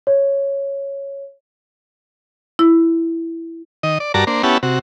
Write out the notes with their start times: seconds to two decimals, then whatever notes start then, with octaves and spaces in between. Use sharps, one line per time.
0.07 C#5
2.59 E4
3.83 D#3 D#5
4.00 D5
4.14 G2 F#4 A#4 D5 A5 A#5
4.27 A#3 D4 C5
4.43 B3 C#4 E4 G4 F#5 A5
4.63 C3 F#4